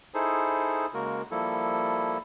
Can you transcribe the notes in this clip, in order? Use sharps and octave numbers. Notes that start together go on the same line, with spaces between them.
D#4 E4 G#4 A4 C5
C#3 G#3 A#3 F#4 A#4
F3 G3 A#3 E4 A4